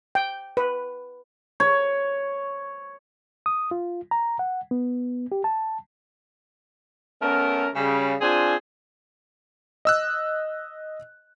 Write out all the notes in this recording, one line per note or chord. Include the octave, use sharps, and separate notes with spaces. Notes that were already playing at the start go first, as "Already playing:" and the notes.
G5
B4
C#5
D#6
F4
A#5
F#5
B3
G4
A5
A3 B3 C#4 A#4
C#3 G3
C4 D4 F4 G#4 G#5
D#5 E6 F#6